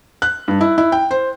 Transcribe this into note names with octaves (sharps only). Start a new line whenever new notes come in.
F#6
G2
E4
E4
G5
C5